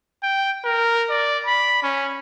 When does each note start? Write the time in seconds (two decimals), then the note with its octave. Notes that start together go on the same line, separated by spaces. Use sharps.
0.23 G5
0.65 A#4
1.10 D5
1.45 B5
1.83 C#4